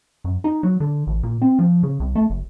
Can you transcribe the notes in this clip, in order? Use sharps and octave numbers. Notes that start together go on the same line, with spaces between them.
F#2
D#4
F#3
D3
A1
A#2
C4
F3
C#3
C2
A3
F#1